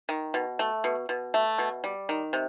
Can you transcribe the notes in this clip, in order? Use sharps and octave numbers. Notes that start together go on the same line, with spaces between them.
D#3
B2
A3
B2
B2
A3
B2
G3
D#3
C3